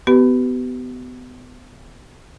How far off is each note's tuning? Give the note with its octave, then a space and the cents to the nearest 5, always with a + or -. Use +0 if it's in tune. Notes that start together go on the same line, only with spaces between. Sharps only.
B3 +25 G4 -40 B4 +0